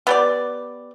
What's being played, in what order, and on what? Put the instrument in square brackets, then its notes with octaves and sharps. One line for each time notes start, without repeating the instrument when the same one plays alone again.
[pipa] B3 G4 D5